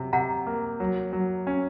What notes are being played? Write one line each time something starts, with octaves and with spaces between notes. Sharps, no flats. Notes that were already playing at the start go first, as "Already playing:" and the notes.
Already playing: C3 F#3
C3 F#5 A#5
A#3
F#3
F#3
C#4